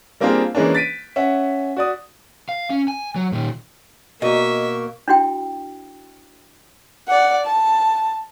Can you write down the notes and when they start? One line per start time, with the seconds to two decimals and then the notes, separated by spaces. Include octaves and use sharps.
0.20 G3 A#3 C4 D4 F4 G#4
0.55 E3 G#3 A#3 C#4 D4
0.74 A6 B6 D7 D#7
1.16 C#4 E5 F#5
1.77 F#4 D5 D#6
2.49 F5
2.70 C#4
2.88 G#5
3.16 F#3
3.32 A#2 D#3
4.22 B2 A#3 A#4 D#5 E5 C#6
5.08 D4 E4 F#4 G5
7.07 D5 F#5
7.46 A5